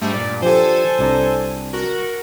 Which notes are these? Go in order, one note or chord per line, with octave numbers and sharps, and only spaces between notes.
G#2 G3 A3 D4
G2 A#2 D5
F3 D4 G4 A4 C5 G#5
C2 D4 A#5
F#4 A#4